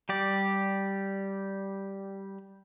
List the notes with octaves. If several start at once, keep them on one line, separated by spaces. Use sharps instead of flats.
G3 G4 D5